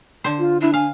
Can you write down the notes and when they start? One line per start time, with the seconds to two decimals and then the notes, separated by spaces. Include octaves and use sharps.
0.24 D3 C5
0.39 F4
0.61 D4 E4
0.74 F5 G#5